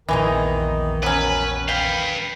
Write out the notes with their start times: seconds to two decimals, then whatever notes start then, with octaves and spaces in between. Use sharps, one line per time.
0.09 A#1 E2 D#3 E3 G#3 D#4
1.03 F#3 C#4 B4
1.69 B4 F5 G5